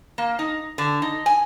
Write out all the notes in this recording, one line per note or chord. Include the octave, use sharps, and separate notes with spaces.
A#3
D#4
D3
D#4
G#5